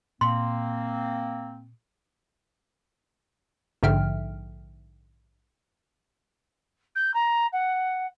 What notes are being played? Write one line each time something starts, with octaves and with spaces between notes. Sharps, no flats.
A#2 A#3 C4 C6
A#1 G#2 D3 E5 G5 F6
G6
A#5
F#5